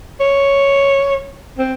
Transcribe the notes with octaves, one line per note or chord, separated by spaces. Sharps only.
C#5
C4